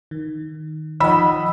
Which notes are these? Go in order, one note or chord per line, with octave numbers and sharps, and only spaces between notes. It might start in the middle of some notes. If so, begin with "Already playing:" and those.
D#3
D#3 F3 D#5 F#5 B5 E6